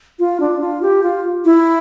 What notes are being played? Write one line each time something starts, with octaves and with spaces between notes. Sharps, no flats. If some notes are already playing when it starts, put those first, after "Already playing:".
F4
D4
F4
G4
F4
E4